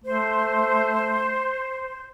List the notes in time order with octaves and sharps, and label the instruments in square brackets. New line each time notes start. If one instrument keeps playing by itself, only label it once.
[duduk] A3 [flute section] C5